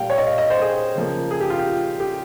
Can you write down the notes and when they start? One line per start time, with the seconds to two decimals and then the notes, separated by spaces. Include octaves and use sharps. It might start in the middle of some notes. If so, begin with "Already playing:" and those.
Already playing: A#2 G3 A#3 F5 G5
0.10 C#5
0.18 D#5
0.27 F5
0.38 D#5
0.50 C5
0.62 G#4
0.96 C#3 F3 A#3
1.31 G#4
1.40 G4
1.50 F4
1.59 G4
2.00 G4